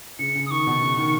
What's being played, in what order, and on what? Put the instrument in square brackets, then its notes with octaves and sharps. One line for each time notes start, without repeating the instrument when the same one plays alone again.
[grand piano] C#3 [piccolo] C#7
[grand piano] C#3
[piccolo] D#6
[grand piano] D#3 [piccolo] C#6
[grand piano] B2
C#3
D#3